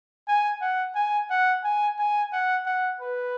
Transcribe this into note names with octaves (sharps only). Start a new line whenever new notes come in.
G#5
F#5
G#5
F#5
G#5
G#5
F#5
F#5
B4